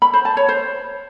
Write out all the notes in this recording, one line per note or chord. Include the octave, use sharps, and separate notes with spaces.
B5
C5
A5
C#5
C5